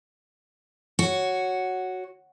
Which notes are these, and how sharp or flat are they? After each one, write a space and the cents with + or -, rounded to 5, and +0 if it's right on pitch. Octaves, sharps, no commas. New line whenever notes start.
F#4 +0 C#5 +0